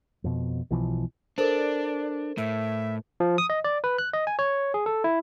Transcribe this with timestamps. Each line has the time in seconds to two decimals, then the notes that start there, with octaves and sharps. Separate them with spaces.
0.24 F2 B2
0.70 B1 B2 E3 F3
1.38 D4 A4 A#4 C5 D5
2.38 A2 E5
3.20 F3
3.38 D#6
3.50 D#5
3.64 D5
3.84 B4
3.98 F#6
4.13 D#5
4.27 G#5
4.39 C#5
4.74 G#4
4.86 A4
5.04 E4